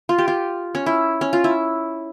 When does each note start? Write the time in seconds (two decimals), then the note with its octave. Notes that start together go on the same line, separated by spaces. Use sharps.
0.09 F4
0.18 G4
0.28 F4
0.75 C#4
0.86 E4
1.21 C#4
1.33 F4
1.44 E4